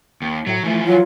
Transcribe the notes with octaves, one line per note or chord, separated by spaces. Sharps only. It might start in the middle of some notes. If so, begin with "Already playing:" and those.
D#2
A2 F#3
E3 F3 A3
F#3 F4